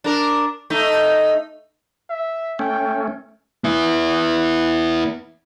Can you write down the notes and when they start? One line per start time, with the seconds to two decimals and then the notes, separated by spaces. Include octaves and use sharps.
0.04 D4 A#4
0.70 A3 D#4
2.10 E5
2.59 A3 C#4 G5
3.64 B3 E4